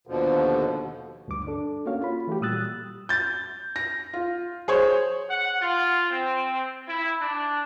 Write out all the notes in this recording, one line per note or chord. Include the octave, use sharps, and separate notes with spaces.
D#2 B2 D3 F3
D2 G2 D3 D6
D4 A4
A#3 C#4 F#4 C#5 F5
F4 B5
E3 A3 F#4 G4
A#2 G3 D#6 E6 F#6 A6
G6 A6
A#6
F4
G#4 C5 C#5
F#5
F4
C4
E4
D4